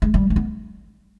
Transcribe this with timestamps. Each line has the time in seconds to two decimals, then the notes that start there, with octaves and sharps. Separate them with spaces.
0.02 G#3
0.14 G3
0.30 A#3
0.36 B3